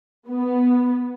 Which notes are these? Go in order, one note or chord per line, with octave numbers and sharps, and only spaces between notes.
B3